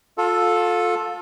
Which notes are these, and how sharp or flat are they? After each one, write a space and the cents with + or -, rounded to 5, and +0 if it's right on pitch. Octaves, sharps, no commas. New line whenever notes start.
F4 +30 A4 +0